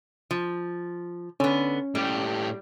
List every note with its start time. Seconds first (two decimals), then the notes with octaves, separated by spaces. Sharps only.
0.31 F3
1.40 D3 B3 C#4
1.95 A2 G3 G4